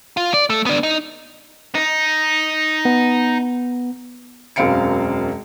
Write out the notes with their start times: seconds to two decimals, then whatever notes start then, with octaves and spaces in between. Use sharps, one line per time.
0.17 F4
0.34 D5
0.50 A3
0.66 B3 D4
0.83 D#4
1.75 D#4
2.85 B3
4.56 E1 F#2 C4 F5 C#7 D7